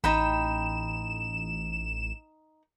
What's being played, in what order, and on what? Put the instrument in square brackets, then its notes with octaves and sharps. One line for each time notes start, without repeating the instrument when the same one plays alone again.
[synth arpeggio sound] A1 E7 [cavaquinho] D#4 G5 B5